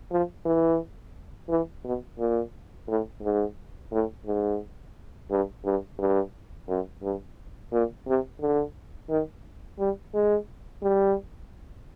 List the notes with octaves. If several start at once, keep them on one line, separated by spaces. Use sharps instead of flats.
F3
E3
E3
B2
A#2
A2
G#2
A2
G#2
G2
G2
G2
F#2
G2
A#2
C3
D3
D#3
G3
G#3
G3